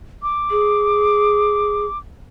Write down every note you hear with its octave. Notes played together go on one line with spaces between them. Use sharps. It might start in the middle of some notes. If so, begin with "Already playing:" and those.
D6
G#4